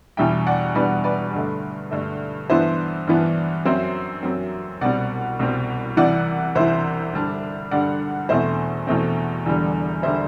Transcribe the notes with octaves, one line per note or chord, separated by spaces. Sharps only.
E2 B2 G3 D4 E5 G5
D5 F#5
E2 B2 G3 D4 B4 D5
B4 D5
G2 D3 A3
G2 D3 A3
G2 E3 B3 D4 C5 E5
G2 E3 B3 D4
F#2 F#3 C4 C5 E5
F#2 F#3 C4
C2 B2 G3 C4 D5 F#5
C2 B2 G3 C4
C2 C3 E3 D5 F#5
C2 C3 E3 C5 E5
G2 D3 G3 D4
G2 D3 G3 D4 D5 F#5
E2 B2 A3 C4 C5 E5
E2 B2 A3 C4
E1 E2 D3 G3
E1 D3 G3 C5 E5